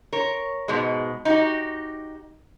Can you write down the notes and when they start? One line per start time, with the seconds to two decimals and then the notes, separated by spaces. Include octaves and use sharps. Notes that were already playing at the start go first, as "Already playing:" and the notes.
0.13 A#4 C#5
0.68 G#2 B2 G#3
1.25 D#4 F#4 G4